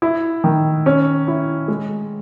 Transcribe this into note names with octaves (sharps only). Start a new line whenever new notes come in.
E4
D#3
C#4
E4
G#3